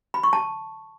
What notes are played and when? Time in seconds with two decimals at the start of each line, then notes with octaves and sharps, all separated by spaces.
0.14 B5
0.23 C#6
0.33 A5